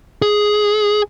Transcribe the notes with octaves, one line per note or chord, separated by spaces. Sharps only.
G#4